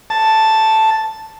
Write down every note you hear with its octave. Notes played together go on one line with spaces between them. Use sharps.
A5